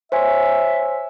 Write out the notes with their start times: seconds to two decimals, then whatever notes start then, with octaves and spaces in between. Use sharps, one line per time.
0.12 C5 C#5 E5 G#5